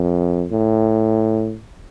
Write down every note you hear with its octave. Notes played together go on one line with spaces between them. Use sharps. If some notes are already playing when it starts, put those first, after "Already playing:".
Already playing: F2
A2